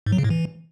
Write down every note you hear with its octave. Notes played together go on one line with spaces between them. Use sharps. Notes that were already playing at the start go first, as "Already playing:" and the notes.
G#2
F#3
C#3
A2
E3